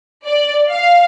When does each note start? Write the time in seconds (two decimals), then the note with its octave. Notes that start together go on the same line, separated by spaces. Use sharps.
0.25 D5
0.70 F5